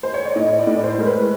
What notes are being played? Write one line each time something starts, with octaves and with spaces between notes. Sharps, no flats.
C5
C#5
D5
A2 D#5
D5
A2
C5
G#3 A#4
B4